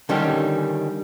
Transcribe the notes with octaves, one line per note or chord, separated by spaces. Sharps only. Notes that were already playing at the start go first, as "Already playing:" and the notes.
D3 D#3 G3 C#4 D4 G4